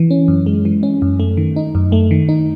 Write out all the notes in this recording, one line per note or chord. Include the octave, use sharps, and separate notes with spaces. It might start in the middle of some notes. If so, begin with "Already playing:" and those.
Already playing: E3
C#4
F#2
G#3
E3
C#4
F#2
A3
D#3
D#4
F#2
A3
D#3
D#4